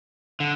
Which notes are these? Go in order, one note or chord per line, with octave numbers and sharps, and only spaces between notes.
D3